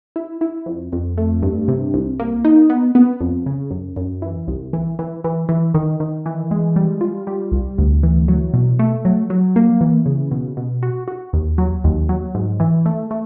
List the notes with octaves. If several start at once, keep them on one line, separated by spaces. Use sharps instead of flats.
E4
E4
F2
F2
A3
G2
C3
C2
A#3
D#4
B3
B3
F2
C#3
F#2
F#2
E3
C2
E3
E3
E3
E3
D#3
D#3
E3
G#3
G3
F4
G3
C2
D2
E3
F#3
B2
A3
F#3
F#3
A#3
E3
C#3
B2
B2
F#4
F#4
D#2
F#3
D#2
F#3
G#2
E3
A3
A3